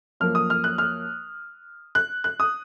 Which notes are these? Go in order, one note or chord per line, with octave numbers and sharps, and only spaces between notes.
F#2 F3 A#3 F6
D#6
F6
F#6
F6
F#6
F#6
D#6